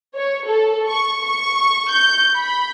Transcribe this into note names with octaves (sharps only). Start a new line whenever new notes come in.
C#5
A4
C#6
C#6
G6
B5